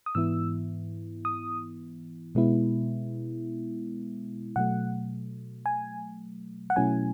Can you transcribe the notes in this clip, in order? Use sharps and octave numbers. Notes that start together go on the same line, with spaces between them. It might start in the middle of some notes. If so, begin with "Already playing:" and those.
D#6
G#2 E3 B3 E4 E6
D#6
B2 G#3 B3 E4
B2 F#3 A3 F#5
G#5
F#5
B2 F#3 A3 C#4 E4 G#5